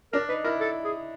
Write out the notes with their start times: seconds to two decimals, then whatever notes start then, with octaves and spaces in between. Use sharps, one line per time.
0.13 D4 A#4
0.29 D#4 B4
0.44 E4 A#4
0.60 A4
0.84 G#4